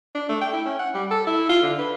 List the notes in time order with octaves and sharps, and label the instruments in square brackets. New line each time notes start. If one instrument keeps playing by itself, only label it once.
[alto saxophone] D4
A3
G5
E4
C#4
F#5
G3
A4
E4
F4
D3
B4